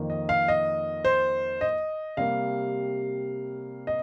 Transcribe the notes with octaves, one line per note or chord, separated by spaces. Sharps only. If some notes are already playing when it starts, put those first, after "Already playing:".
Already playing: F2 D#3 A#3
D#5
F5
D#5
C5
D#5
C3 G3 A#3 F5
D#5